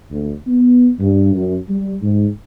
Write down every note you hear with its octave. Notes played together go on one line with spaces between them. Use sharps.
D2
B3
G2
F#2
G3
G#2